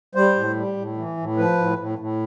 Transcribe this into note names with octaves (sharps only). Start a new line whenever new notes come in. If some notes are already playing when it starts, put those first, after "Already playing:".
G3 C5
A2
G3
A2
E3
A2
F3 B4
A2
A2
A2